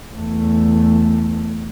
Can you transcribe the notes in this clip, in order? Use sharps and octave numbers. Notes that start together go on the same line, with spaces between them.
E2 A3